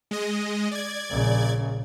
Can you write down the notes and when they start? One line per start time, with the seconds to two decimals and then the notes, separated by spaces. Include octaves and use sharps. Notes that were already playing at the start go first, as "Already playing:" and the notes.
0.11 G#3 D#5
0.71 D5 G#6
1.11 A#1 C#3